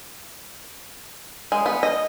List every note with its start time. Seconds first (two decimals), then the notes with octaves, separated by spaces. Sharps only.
1.52 G#3
1.66 B3
1.83 D#5